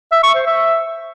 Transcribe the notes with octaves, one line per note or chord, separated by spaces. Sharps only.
E5
C#6
C5
E5